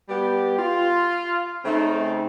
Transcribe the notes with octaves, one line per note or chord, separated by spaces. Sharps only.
G3 B3 G4
F4
C#3 A3 C4 D#4